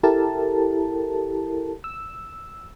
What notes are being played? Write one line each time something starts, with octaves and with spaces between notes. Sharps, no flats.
E4 G4 A4 A#4 A5
E6